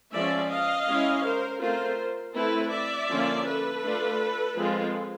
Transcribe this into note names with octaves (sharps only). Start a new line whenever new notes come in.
F3 G#3 C#4 D5 E5
D#5 F5
G#3 C#4 E4
A#4 C5
A3 C4 F4 A#4 C5
A3 C4 E4 A4 B4
D5 E5
D3 F3 A#3 C#4 F4
A4 B4
A3 D4 F4
F3 G#3 C4 F4